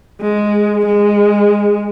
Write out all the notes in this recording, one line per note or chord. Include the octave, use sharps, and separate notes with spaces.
G#3
G#3